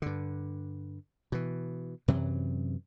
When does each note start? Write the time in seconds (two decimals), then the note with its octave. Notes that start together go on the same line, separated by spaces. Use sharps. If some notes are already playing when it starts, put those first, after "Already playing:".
0.02 G2 D3
1.32 B2 E3
2.08 F#2 C3 E3 F#3